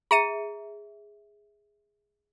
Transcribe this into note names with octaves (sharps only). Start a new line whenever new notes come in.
G#4 E5 A#5 C#7 D#7